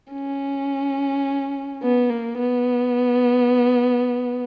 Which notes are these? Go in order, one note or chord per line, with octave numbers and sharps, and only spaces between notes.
C#4
B3
A#3
B3